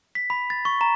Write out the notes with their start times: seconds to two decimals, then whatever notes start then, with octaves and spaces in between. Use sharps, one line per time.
0.15 B6
0.30 B5
0.50 A6
0.65 C#6
0.81 A#5